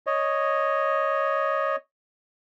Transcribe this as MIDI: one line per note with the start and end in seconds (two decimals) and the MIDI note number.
0.07 1.76 73
0.07 1.76 75